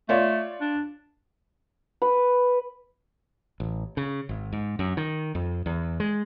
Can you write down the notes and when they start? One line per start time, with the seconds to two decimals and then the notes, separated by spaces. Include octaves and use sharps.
0.09 A3 F4 C#5 D5
0.61 D4
2.02 B4
3.60 A1
3.97 C#3
4.29 G#1
4.52 G#2
4.79 F#2
4.97 D#3
5.35 F2
5.66 E2
6.00 G#3